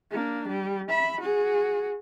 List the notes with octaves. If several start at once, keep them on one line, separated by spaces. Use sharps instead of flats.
A#3 D4
G3
E5 B5
F#4 G#4